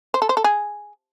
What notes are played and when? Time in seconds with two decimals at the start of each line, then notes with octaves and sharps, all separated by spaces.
0.14 C5
0.22 A4
0.29 C5
0.37 A4
0.44 G#4